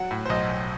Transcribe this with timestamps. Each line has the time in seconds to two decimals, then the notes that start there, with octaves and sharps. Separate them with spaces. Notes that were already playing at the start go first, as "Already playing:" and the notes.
Already playing: F#3 F#5
0.11 A2
0.26 C5
0.30 B1 D#5
0.49 B1